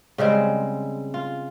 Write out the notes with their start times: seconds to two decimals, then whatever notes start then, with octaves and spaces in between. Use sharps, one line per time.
0.18 C#3 G3 G#3 C4
1.14 F4